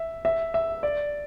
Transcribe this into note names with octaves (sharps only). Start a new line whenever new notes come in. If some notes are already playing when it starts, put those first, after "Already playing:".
Already playing: E5
E5
E5
D5